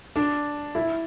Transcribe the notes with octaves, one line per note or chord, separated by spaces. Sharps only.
D4
E4